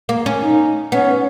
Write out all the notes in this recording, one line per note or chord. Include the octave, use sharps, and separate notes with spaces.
A#3
C#4
D#4
B3 C#4